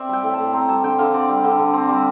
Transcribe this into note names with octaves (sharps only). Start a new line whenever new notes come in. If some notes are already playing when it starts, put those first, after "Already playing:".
Already playing: C4 D5 E5
G3 G5
A2
A5
A2
C4 A#5
G3 A5
D3 G5
D3 F5
C4 D5
G3
D3
D3
C4
G3